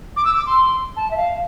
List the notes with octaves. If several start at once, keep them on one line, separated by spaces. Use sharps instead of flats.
D6
E6
D6
C6
A5
E5
F5